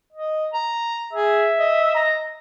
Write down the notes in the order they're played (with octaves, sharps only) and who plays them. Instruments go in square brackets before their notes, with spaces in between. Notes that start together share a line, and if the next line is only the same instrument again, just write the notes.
[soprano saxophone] D#5
A#5
[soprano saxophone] G#4 [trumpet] E5
[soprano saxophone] D#5
[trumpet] A#5